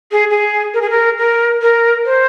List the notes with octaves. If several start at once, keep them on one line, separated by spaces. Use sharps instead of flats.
G#4
G#4
A#4
G#4
A#4
A#4
A#4
C5